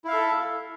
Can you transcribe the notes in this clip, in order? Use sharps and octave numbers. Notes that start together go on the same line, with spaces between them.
E4 A4 E5 F5